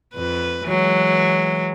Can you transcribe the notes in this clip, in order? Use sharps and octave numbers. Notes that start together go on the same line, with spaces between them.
F2 B4
E3 F#3 G#3